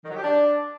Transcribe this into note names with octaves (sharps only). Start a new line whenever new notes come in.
D#3
F#3
G4
D4